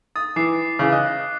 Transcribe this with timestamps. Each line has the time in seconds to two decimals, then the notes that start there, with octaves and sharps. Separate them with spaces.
0.16 D#6 A6
0.36 E3 D6 D#6 C7
0.79 C#3 E3
0.92 D#5 F#6